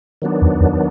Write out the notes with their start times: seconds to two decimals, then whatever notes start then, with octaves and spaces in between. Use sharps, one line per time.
0.22 D#3 F#3 B3 D4
0.41 E2
0.60 E2